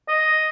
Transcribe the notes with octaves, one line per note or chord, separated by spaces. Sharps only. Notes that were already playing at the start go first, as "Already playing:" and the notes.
D#5